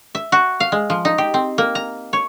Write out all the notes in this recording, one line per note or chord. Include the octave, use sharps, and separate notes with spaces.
E5
F#4
F5
G#3
F3
D#4
G4
C4
A#3
A#5
C#5